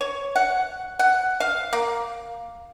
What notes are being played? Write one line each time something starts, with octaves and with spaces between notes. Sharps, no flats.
C#5
F#5
F#5
F5
A#3